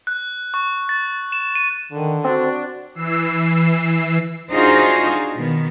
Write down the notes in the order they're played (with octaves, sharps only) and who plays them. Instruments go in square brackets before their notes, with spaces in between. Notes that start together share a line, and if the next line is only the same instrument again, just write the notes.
[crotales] F#6
C#6
A6
E7
D#7
[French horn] D3 [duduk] D#3
[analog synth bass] C4 [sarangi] D4 [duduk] F#4
[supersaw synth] E3 E6 C7
[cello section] D4 D#4 F4 F#4 G#4 C5
B2 D#3 B3